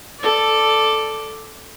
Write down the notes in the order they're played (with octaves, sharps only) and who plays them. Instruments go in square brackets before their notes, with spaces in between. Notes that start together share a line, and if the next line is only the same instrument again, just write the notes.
[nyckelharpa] A4 D5